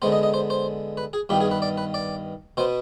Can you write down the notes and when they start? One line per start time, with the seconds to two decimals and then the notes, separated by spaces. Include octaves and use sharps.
0.02 D3 G#3 B3 C5
0.12 D#5
0.23 D#5
0.34 C5
0.50 C5
0.97 B4
1.13 G#4
1.29 G2 D#3 B3 G4
1.40 G#4
1.51 B4
1.62 D5
1.78 B4
1.94 D5
2.57 B2 B3 C5